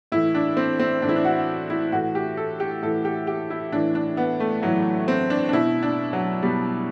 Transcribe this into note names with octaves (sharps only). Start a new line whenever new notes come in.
A2 E3 E4
D4
C4
C4
A2 E3 D4 E4
D4
F#4
E4
A2 E3 F#4
G4
A4
G4
A2 E3 A4
G4
G4
E4
A2 E3 D4
D4
B3
A3
A2 E3 F#3
C4
D4
D4
B2 E4
D4
F#3
B2 G3